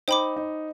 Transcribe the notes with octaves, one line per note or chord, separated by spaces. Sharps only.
D#4 C5 G5 B5 D6
D#4